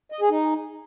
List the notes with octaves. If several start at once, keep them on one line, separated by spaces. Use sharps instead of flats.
D#5
G#4
D#4